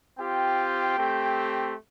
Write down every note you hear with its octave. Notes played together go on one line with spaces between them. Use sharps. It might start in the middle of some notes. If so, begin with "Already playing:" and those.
C4 F4 G4 G5
A3 C4 G4